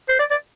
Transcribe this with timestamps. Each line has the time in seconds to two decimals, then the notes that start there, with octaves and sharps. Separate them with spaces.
0.09 C5
0.19 D5
0.31 D5